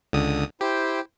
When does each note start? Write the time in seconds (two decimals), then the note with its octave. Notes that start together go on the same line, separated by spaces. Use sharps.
0.13 C#2 D3 D#6
0.61 E4 G4 C5 G5